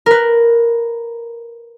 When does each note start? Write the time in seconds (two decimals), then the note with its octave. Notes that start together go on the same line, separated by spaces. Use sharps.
0.06 A#4 B4